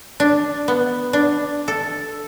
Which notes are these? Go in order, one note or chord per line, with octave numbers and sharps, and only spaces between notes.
D4
B3
D4
A4